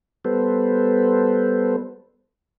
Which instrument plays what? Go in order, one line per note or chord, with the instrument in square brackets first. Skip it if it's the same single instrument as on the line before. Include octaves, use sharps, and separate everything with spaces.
[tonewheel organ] G3 B3 A4 B4 C5